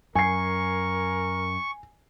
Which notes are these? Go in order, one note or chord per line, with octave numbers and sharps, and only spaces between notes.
F#2 A#4 G#5 C#6 C7